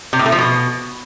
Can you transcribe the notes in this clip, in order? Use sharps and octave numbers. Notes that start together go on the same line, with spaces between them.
C3
A2
A3
F3
B2